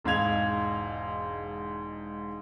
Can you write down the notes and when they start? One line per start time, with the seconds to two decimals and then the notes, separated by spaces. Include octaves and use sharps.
0.04 E1 G#2 F5 G#6 F7